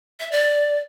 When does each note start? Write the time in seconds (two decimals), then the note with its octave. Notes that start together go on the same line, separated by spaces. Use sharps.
0.20 E5
0.32 D5